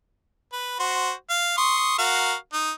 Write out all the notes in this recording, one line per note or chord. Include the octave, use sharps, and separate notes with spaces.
B4
F#4 C5
F5
C6 C#6 D#6
F#4 A#4 F5
D#4